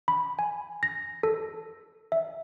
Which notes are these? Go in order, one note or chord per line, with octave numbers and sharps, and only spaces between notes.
B5
G#5
A#6
A4
E5